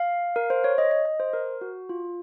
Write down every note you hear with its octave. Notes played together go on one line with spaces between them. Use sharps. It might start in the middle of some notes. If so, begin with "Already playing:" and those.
Already playing: F5
A#4
C5
C#5
D#5
D#5
D#5
C5
A#4
F#4
F4